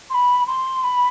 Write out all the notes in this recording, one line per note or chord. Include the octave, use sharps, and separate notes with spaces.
C6
B5
C6
B5